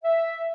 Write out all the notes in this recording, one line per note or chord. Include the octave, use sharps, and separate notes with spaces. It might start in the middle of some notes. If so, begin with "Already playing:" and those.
E5